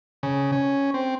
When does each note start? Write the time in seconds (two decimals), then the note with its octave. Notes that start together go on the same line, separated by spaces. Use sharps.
0.23 C#3
0.52 C#4
0.94 C4